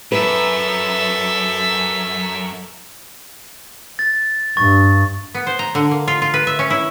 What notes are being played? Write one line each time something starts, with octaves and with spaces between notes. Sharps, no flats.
F#2 A4 B4 E5
A6
G2 C#6 A6
B3
C5
A#5
D3
A#3
F4
F4
B4
E5
C#4
E4